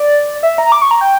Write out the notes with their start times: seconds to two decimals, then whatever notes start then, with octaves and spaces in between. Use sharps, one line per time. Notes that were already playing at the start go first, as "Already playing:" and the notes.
Already playing: D5
0.43 E5
0.58 A#5
0.72 D6
0.82 C#6
0.91 A#5
1.01 G5